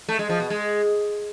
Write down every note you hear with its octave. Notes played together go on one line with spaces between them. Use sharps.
A3
G#3
F3
B2
G#3